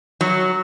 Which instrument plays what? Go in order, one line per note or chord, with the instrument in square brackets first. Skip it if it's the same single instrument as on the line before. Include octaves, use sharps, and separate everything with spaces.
[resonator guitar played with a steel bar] F#3